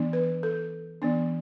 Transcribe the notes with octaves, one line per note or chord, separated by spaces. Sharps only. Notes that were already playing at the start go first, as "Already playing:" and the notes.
Already playing: E3 B3 D4
B4
A4
E3 B3 D4